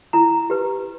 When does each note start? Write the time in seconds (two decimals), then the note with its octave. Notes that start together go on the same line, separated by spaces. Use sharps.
0.13 E4 A#5
0.50 G4 B4